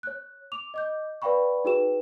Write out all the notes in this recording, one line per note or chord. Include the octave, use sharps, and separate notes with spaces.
C#5 F#6
D6 F7
D#5 D6 G6
B4 D5 F5 G5 B5 C#6
D#4 F#4 G#4 B4 G5 E7